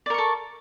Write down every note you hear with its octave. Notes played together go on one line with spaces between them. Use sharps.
A4 A#4 D5 C#6